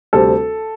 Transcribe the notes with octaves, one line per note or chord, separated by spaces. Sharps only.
D2 C3 G3 C4 A4